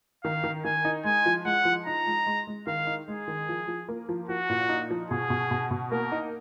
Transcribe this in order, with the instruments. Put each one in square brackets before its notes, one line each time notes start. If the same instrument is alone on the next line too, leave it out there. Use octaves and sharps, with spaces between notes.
[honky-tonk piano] D#3 [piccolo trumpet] F5
[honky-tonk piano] D#3
[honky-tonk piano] D#3 [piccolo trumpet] G#5
[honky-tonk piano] D#4
[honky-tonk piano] G#3 [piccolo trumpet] G#5
[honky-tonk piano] F3
[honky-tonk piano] G#3 [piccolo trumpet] F#5
[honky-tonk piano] F3
[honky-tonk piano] D#4 [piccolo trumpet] A#5
[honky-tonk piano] G#3
G#3
G#3
[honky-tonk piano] D#3 [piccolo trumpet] F5
[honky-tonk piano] D#4
[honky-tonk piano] G#3 [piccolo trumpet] G#4
[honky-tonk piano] D#3
F3
F3
A#3
F3
[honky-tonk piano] F3 [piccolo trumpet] F#4
[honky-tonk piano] A#2
D#4
F3
[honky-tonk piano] B2 [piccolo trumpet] G#4
[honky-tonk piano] B2
B2
B2
[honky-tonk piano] A#3 [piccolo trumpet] A#4
[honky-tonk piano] D#4